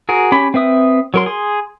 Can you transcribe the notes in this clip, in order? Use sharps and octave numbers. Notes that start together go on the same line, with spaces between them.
F#4 G#4 A#4
C#4 G4 B5
C4 B4 E5 D#6
F#3 A#4 C6
G#4 C6